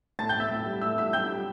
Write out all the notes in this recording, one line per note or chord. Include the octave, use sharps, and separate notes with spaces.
A2 A5 A6
G5 G6
A2
E5 E6
A2
G3
A2 E5 E6
G3 E5 E6
G3 G5 G6
G3